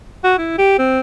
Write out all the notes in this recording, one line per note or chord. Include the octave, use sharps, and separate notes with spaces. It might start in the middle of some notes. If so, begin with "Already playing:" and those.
F#4
E4
G4
C4